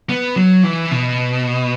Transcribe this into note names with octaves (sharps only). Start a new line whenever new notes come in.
B3
F#3
E3
B2